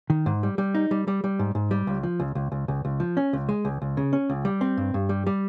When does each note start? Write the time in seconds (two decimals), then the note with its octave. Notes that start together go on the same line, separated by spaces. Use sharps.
0.10 D#3
0.26 G#2
0.43 G3
0.58 G3
0.75 D#4
0.91 G3
1.08 G3
1.24 G3
1.39 G#2
1.55 G#2
1.71 G3
1.87 C#2
2.03 F3
2.20 C#2
2.35 C#2
2.52 C#2
2.68 C#2
2.85 C#2
3.00 F3
3.17 C#4
3.33 C#2
3.49 G#3
3.65 C#2
3.82 C#2
3.97 C#3
4.13 C#4
4.29 C#2
4.45 G3
4.61 C4
4.77 G2
4.94 G2
5.09 G3
5.27 G3